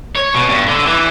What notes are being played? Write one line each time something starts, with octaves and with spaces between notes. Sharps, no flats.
C#5
B2
G2
D3
E3